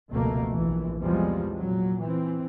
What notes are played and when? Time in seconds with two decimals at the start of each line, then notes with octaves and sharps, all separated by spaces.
0.11 F1 C#2 B2 A3 A#3
0.53 A#1 E3
1.02 E2 C3 F3 G3 G#3
1.57 A#2 F#3
2.01 E3 C4